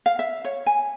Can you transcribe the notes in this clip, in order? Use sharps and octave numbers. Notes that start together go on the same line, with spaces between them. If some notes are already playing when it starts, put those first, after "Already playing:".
F5
E5
C#5
G#5